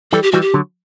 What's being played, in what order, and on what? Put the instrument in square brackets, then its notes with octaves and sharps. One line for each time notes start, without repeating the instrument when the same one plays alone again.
[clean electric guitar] E3 G3 [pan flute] A4
[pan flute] G4
[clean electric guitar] E3 G3 [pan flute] F#4
[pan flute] G4
[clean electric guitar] D3 F#3